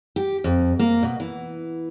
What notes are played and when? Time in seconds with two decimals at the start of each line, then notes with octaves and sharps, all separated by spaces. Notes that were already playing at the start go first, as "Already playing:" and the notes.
0.16 G4
0.44 F2
0.79 A#3
1.03 B2
1.20 E3